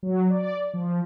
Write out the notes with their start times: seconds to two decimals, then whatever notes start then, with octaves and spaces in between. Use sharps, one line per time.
0.03 F#3
0.30 D5
0.74 F3